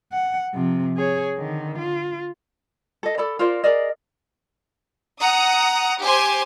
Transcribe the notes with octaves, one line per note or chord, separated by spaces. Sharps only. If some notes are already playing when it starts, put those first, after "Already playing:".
F#5
C3 F3
G#4 C#5
D3 D#3
F4
A4 D#5
A4 D5 B5
F4 A#4 C5 D5
G#4 A#4 D5 D#5
F#5 A#5 D#6
G4 C5 G#5 C6